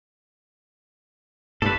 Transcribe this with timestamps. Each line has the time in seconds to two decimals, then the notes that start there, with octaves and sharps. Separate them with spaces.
1.62 G2 A4 B4